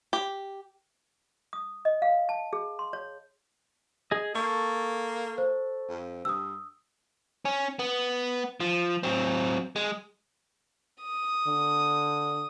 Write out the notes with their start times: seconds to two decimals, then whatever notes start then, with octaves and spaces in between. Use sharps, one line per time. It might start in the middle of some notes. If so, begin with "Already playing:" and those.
0.13 G4
1.53 D#6
1.85 D#5
2.02 F5
2.29 A5
2.53 G#4
2.79 C6
2.93 C#5
4.11 G#4 D#5
4.35 A#3 A4 C#6
5.38 C5
5.88 F2
6.25 G2 D#6 E6
7.45 C#4
7.79 B3
8.60 F3
9.03 F#3 C4
9.76 G#3
11.03 D#6
11.46 D3